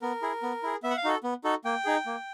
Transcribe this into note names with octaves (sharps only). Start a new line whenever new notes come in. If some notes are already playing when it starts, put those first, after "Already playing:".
B3 A#4
E4 G#4
B3
E4 G#4
B3 E5
F#5
F5
D#4 F#4 A4
B3
D#4 F#4 A4
A#3 G5
D#4 G#4
A#3